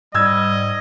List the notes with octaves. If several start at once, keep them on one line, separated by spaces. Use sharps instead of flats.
G#2 G3 D#5 E6 G#6